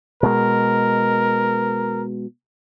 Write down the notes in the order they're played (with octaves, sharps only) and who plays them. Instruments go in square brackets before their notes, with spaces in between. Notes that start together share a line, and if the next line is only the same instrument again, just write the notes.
[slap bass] B2 G#3 [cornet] A#4